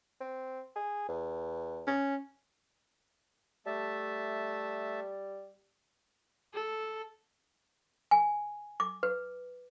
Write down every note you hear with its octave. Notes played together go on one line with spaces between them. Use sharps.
C4
G#4
E2
C#4
G3 A3 E5 A5
A4
G#5
D6
B4